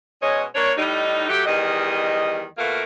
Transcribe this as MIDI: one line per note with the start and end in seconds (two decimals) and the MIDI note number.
0.22 0.43 47
0.22 0.43 56
0.22 0.43 61
0.22 0.43 73
0.22 0.43 75
0.55 0.72 58
0.55 0.72 62
0.55 0.72 73
0.77 1.25 45
0.77 1.25 55
0.77 1.25 63
1.28 1.45 54
1.28 1.45 57
1.28 1.45 67
1.45 2.44 40
1.45 2.44 51
1.45 2.44 55
1.45 2.44 75
2.58 2.82 47
2.58 2.82 57
2.58 2.82 58
2.58 2.82 65
2.58 2.82 70